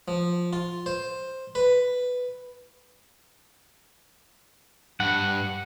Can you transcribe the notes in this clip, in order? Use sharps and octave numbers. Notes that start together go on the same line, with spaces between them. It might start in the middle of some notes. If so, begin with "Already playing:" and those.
F3
F4
C5
B4
G2 F#5